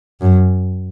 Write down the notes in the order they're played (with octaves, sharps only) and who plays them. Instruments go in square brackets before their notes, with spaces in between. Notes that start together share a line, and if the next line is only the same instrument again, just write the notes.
[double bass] F#2